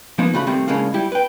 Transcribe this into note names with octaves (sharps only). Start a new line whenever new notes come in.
F3 A#3 B3 D#4
C#3 A3 F#4 B5
C3 D#3 G3 A3 C4
A2 C#3 G#3 A#3 D4 F5
G3 E4 G4
B4 G5